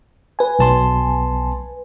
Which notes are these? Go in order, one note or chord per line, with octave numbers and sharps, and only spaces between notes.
B4 G#5
B1 A5 C6